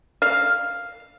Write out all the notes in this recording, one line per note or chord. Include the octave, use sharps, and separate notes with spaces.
F5